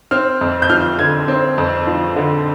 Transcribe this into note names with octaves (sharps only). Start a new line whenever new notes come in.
C4 F6
F2
G6
F3 F6
D3 G#6
C4
F2
F3
D3